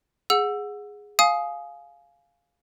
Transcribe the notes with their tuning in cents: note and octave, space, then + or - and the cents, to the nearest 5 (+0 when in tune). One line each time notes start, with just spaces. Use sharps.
G#4 -5 F#5 -25 E6 +15
F5 +0 G#5 +20 D#6 +5